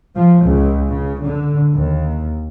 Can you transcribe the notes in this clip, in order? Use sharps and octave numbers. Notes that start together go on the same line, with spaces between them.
F3
C#2
C#3
D3
D#2